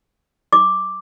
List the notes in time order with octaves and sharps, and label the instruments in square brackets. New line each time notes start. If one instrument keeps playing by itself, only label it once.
[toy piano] D6